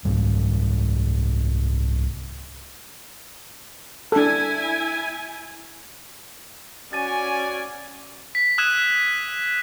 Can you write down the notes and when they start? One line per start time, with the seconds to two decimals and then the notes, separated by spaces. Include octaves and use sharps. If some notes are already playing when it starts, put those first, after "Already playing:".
0.05 C2 G#2 G3
4.12 D4 E4 A4 G#5
6.93 C#4 F#4 D5 G#5 A6 D#7
8.35 B6
8.58 D#6 E6 F#6 G#6 D#7 E7